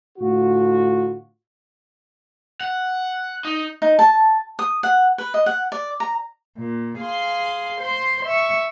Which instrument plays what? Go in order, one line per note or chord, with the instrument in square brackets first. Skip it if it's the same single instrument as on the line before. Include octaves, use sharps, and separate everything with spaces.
[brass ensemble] A2 D3 F4 F#4
[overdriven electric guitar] F#5
D#4
[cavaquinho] D#4
A5
D#6
F#5
B4
D#5
F#5
D5
A#5
[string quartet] A#2
G#4 F5 C6
C5 C6
E5 C#6